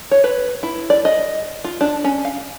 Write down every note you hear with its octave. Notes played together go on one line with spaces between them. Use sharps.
C#5
B4
E4
D5
D#5
F4
D4
C#4
F5